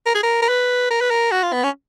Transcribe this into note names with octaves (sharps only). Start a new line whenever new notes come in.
A#4
G#4
A#4
A#4
B4
A#4
B4
A#4
F#4
F4
B3
C#4